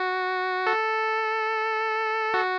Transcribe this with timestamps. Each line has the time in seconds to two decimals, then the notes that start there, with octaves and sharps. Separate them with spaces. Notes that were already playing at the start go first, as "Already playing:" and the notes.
Already playing: F#4
0.67 A4
2.34 F#4